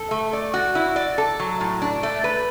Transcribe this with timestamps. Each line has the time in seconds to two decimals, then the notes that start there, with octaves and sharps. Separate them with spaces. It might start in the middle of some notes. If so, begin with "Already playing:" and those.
Already playing: A4
0.11 A3
0.33 D5
0.54 F#4
0.75 E4
0.96 D5
1.18 A4
1.40 F#3
1.60 A2
1.82 D4
2.03 A3
2.24 B4